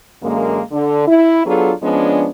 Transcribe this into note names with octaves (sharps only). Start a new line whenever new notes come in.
F#2 D3 G#3 A#3
D3
E4
F#3 B3 D4 F4 G#4 A4
F3 G#3 B3 C#4 D4